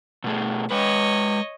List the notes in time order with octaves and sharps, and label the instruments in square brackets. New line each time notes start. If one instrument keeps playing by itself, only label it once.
[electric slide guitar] B2 A3 G#4
[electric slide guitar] G#3 B4 [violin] C#5 D#5